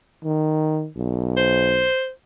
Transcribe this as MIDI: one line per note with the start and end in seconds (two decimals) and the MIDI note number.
0.25 0.87 51
0.97 1.88 35
1.37 2.10 72